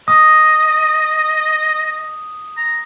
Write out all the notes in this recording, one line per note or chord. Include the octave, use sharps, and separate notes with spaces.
D#5 D#6
A#5